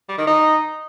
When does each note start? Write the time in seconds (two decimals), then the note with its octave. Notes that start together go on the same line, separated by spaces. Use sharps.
0.09 G3
0.18 D#3
0.27 D#4